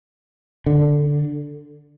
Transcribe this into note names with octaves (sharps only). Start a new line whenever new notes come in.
D3